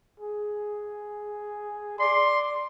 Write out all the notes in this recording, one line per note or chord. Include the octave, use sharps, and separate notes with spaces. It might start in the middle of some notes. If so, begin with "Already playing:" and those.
G#4
D5 C6